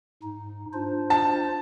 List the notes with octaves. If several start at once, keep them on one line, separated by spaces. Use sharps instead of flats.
G#2 D#4
D4 F4 C5
A5